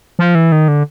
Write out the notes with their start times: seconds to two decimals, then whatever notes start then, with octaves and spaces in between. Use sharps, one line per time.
0.19 F3
0.35 E3
0.52 D#3
0.68 D3